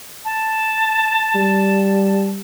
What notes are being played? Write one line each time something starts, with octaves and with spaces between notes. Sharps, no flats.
A5
G3